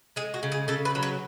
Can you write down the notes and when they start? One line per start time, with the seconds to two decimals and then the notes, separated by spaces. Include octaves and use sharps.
0.16 G#3 G#4
0.34 F#4
0.43 C#3
0.52 G#4
0.68 C#3 A4
0.85 B4
0.95 F#3
1.03 B4